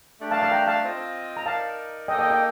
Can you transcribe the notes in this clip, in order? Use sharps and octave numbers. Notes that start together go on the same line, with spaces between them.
A3 D4 G4 D5
F5 A5
F5 A5
G5 A#5
F5 A5
C4 F4 C5 D#5
A#5
D#4 A#4 D5 F5 A5
A#3 D#4 A4 D#5 G5
D#5 G5
D#5 G5